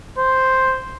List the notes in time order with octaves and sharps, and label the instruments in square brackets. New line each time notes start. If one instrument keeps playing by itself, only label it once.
[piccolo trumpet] C5